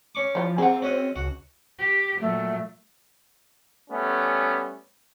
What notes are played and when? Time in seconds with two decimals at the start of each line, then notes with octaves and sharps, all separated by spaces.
0.15 C#4 C#6 D6
0.35 E3 F3 F4
0.58 A#3 C4 F4 G#4 F#5
0.82 C#4 F#4 D#5
1.16 C#2 F#4
1.79 G4
2.21 A#2 F#3 A3
3.90 G3 A3 B3 C#4